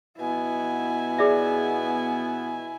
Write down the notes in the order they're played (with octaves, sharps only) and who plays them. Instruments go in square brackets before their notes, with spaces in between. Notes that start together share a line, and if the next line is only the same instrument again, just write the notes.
[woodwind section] B2 B3 [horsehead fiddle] E4 G#5
[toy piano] G#4 D5 E5